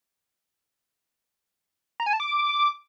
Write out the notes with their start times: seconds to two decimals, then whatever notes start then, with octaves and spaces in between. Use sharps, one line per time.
2.00 A#5
2.06 G#5
2.13 A5
2.20 D6